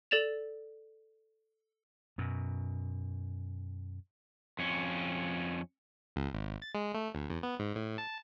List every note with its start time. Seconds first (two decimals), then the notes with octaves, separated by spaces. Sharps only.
0.11 A4 D5 A6 E7 F7
2.18 F#2 B2
4.59 F2 C#4
6.16 C#2
6.33 G#1
6.62 A6
6.75 G#3
6.95 A3
7.15 D2
7.30 E2
7.43 B3
7.59 G#2
7.76 A2
7.98 A5